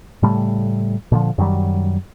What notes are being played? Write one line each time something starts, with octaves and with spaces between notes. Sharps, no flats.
A2 C#3 G3 A3
A#2 D3 F3
F#2 D#3 F#3 G3